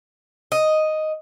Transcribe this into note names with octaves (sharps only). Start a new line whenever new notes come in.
D#5